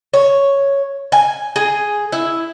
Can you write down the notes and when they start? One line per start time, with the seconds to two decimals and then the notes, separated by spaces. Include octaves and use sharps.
0.14 C#5
1.12 G#5
1.56 G#4
2.12 E4